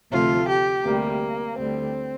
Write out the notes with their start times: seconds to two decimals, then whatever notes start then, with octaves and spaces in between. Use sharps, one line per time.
0.11 D2 C3 F3 A3 F4
0.48 G4
0.85 D2 C3 G3 A#3
1.58 D2 D3 G3 C4